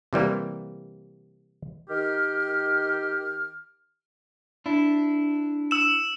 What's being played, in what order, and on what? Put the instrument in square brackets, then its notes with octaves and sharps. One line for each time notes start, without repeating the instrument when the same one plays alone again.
[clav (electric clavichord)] C3 E3 G3 A#3
[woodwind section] D#3 G4 F6
[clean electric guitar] D4 E4
[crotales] E6 E7